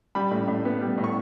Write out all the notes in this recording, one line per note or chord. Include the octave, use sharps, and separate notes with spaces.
G3 B5
A2
A2
B3
G3
A2
C#6